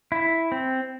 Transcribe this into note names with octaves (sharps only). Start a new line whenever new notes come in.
E4
C4